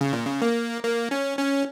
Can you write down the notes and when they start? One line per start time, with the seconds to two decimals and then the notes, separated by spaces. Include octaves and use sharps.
0.01 C#3
0.13 A#2
0.26 C#3
0.42 A#3
0.83 A#3
1.11 C#4
1.39 C#4